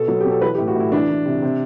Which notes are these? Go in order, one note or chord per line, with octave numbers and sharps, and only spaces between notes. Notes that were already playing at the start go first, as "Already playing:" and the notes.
Already playing: B2 A4
F#3
B2 G4
A4
E3 B4
G4
A2
F#4
A2 E4
E3 D4
E3
C3
C3